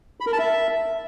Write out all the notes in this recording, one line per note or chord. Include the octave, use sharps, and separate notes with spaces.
B5
A#4
A5
E5